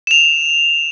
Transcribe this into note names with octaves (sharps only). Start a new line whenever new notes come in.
E7 F7